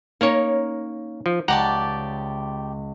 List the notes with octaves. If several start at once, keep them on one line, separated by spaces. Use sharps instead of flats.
A#3 C#4 D#4 A#4 C#5
F3
C#2 G4 D5 F#5 A5 A#5